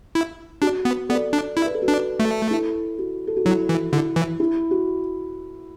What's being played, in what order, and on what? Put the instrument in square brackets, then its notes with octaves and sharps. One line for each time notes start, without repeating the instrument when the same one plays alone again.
[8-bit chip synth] E4
[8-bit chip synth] D4 [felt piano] F#4
[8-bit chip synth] B3
[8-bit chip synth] B3 [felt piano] A4 D5
[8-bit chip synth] D4
[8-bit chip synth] E4 [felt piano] D5
[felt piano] B4
A4
F#4 B4
[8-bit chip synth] D4
A3
[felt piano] E4 A4
F#4
A4
F#4
[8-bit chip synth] F#3 [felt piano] E4
[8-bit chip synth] E3
[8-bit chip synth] D3 [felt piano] E4
[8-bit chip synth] E3
[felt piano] E4
F#4